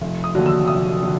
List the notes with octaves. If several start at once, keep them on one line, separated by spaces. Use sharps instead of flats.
F1
D#6
D#2 D3 F#3
E6
F1 D#6
D3 F#3